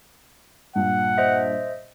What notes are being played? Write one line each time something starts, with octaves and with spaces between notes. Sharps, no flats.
G2 A#2 F#5
C5 D#5 E5